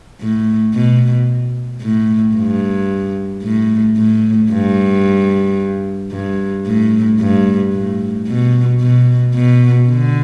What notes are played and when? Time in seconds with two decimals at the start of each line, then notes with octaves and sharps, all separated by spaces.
0.21 A2
0.74 B2
1.82 A2
2.35 G2
3.43 A2
3.97 A2
4.51 G2
6.12 G2
6.67 A2
7.20 G2
7.73 A2
8.28 B2
8.81 B2
9.35 B2
9.89 D3